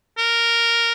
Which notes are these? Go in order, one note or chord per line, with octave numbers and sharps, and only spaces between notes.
A#4